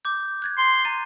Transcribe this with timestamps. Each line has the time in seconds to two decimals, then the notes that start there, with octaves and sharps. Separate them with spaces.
0.05 D6 G6
0.42 F#6 G#6 A6
0.58 C6
0.85 A#5 A6 D#7